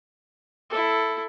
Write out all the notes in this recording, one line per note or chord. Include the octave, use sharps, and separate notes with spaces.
E4 A4